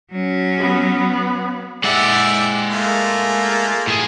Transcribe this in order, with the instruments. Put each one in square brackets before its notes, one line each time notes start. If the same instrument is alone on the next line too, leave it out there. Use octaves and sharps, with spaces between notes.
[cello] F#3 C#4
[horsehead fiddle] B3
[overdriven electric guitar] G#3 F#5 [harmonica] G4 D5 E5
[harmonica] A3 A#3 F4
[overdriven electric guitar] A2 G#4